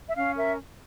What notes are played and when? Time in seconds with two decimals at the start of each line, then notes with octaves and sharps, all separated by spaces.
0.08 E5
0.15 C#4 F5
0.36 A#4 E5